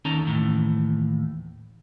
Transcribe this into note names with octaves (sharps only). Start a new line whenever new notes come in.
D#2 C#4 D#4 A4 A#5
D#2 A2 E3